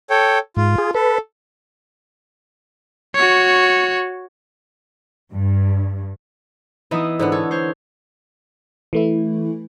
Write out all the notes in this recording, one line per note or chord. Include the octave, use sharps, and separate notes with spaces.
A4 C#5 G5
G#2 F4
G#4
A4 B4
F#4 C#5
G2
E3 B3 D#4 E4 D#6
G#2 D3 B3
A4 C#5
C5 C#5
E3 A3 E4